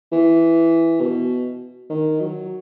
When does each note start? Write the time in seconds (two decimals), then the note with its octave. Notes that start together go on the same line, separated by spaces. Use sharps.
0.12 E3
1.01 B2
1.90 D#3
2.20 F#3